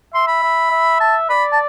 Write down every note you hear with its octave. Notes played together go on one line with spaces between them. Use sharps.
E5 C6
B5
E5
E5
A5
D5 B5
A5